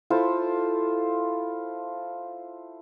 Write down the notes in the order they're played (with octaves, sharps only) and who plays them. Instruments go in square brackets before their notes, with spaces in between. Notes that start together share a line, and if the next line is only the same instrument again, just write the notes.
[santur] E4 F4 A4 C5